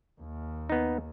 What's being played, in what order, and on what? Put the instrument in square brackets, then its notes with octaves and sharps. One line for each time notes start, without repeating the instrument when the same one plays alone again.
[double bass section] D#2
[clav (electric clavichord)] B3 D#4